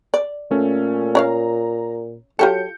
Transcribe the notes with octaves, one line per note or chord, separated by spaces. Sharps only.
D5
A#2 A3 C#4 A4
C#4 D5 F5 A#5
F#3 F4 G4 A4 G6 C#7